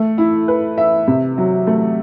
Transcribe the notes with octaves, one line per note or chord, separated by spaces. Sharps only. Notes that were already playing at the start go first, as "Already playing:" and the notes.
Already playing: A3
E4
B4
E5
C3
F#3
A3